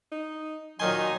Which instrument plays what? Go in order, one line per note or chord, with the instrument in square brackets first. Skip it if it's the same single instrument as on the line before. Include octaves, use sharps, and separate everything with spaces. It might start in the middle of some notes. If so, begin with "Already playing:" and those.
[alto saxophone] D#4
[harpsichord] A#2 D#3 C6 [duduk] F#3 [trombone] D#4 [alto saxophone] G#5